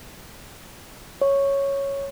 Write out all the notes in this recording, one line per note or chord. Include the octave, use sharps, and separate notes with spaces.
C#5